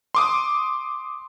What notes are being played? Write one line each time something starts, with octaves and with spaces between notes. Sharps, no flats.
C6 D6 D#6